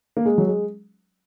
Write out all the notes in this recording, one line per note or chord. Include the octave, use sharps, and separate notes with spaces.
A#3
G#3
F#3
G#3